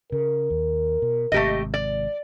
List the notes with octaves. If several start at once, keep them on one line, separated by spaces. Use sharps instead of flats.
C#3 A#4
D#2
B2
G#1 G#2 C3 A3 G4 D#5
D5